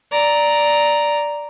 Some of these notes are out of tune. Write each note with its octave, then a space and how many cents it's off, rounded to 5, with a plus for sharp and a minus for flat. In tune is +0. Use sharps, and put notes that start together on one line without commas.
D5 +0 A#5 +0